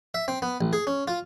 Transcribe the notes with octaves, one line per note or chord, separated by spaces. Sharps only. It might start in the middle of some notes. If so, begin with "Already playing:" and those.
E5
C4
B3
A1
G#4
C#4
F4